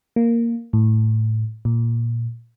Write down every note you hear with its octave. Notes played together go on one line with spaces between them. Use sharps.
A#3
A2
A#2